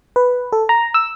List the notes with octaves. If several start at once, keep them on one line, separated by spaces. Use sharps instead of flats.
B4
A4
A#5
E6